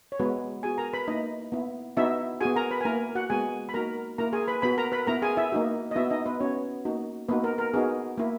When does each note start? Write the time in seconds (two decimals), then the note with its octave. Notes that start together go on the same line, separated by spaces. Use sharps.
0.12 C#5
0.19 G#3 B3 F#4 B4
0.63 B3 F#4 G#4 G#5
0.78 A#4 A#5
0.94 B4 B5
1.08 A#3 D#4 E4 D#5
1.52 B3 E4
1.97 B3 D#4 E4 F#4 E5
2.41 B3 F#4 G#4 G#5
2.56 A#4 A#5
2.71 B4 B5
2.81 G#5
2.85 A#3 E4 A#4 A#5
3.15 F#4 F#5
3.30 G#3 B3 F#4 G#4 G#5
3.69 B5
3.74 A#3 D#4 F#4 A#4 A#5
4.18 A#3 E4 A#4 A#5
4.33 G#4 G#5
4.48 B4 B5
4.62 B3 F#4 B4 B5
4.78 A#4 A#5
4.92 B4 B5
5.07 B3 E4 A#4 A#5
5.22 G#4 G#5
5.37 E4 E5
5.52 A#3 D#4 F#4
5.91 D#5
5.95 B3 E4 F#4 E5
6.10 D#4 D#5
6.26 B3 B4
6.40 B3 C#4 F#4 C#5
6.85 A#3 D#4 F#4
7.28 A#3 B3 D#4 F#4 B4
7.44 A#4
7.58 A#4
7.74 B3 D#4 F#4 G#4
8.18 A#3 E4